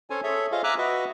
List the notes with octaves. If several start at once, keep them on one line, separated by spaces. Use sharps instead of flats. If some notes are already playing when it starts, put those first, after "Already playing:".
C#4 A4 C5 C#5 G#5
G#4 A4 C#5 E5
F4 G#4 C5 D#5 F5
E5 G#5 A#5 D6 E6 F#6
F#4 B4 D#5 E5